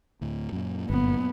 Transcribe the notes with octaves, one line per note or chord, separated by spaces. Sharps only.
D2 A2
F#2 A#2
G1 F#2 A#2 B3